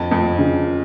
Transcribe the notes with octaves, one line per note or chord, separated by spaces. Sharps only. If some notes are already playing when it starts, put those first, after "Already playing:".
Already playing: F2 A5
F2
C#3